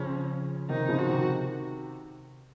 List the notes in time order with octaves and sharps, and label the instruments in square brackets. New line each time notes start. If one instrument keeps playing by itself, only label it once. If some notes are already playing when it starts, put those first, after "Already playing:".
Already playing: [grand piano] C#3 F3 [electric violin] C#4
[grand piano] C3 D#3 [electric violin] D#4
[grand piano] C#3 F3
[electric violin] F#4
[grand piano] C3 D#3